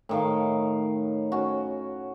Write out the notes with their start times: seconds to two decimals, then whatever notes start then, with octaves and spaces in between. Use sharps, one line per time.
0.09 A2 D#3 F5
1.32 C#4 F#4